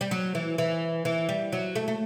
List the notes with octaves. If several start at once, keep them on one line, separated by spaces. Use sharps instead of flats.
G3
F#3
E3
E3
E3
G3
F#3
A3
A3